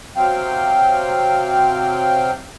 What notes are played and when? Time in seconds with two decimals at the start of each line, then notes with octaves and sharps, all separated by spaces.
0.16 C3 F#3 C4 F5 G5